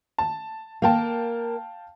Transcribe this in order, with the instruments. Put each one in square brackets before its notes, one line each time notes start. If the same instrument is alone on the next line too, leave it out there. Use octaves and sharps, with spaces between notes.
[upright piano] A5
[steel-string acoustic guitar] A#3 A#4 [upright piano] F5 G5 A5